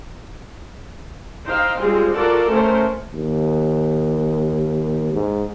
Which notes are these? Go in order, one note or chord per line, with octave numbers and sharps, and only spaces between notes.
D#4 C5 F5 G5
G3 G#3 C4 F4 G#4
F4 F#4 A4 A#4 D5
A3 C#4 A#4 C5
D#2
G#2